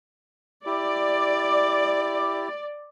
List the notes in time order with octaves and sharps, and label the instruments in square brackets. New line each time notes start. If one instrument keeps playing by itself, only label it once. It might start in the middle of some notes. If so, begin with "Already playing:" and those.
[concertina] E4 G4 [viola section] D5